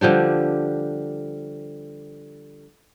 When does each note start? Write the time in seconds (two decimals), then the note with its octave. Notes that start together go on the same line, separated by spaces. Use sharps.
0.01 D3 F3 G3 D4